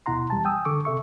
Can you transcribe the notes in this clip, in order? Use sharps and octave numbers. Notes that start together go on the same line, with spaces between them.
D#2 B2 E4 F#5 A#5 C6
E2 G3 A5
G5 G#5 D#6 E6
D3 A4 C#6 D6
C3 A4 E5 C#6